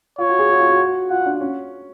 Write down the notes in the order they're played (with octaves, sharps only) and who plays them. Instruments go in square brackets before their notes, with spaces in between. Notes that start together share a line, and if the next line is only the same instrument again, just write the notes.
[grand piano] F4 [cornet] C#5
[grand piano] F#4
G#4
F#4
F4
F#4
[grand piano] F4 [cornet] F#5
[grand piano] D4
C#4